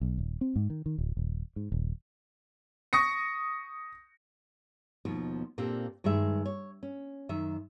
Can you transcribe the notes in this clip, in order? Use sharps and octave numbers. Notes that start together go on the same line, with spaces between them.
B1
D#1
C4
G#2
D#3
D#3
D1
D#1
G#2
D#1
C#6 D#6 A#6 C#7
D#2 B2 F3
A#2 A#3 C4 D4 G4 A4
G2 D#3 G#3 G#4 E5
C#5
C#4
F#2 D#3 E5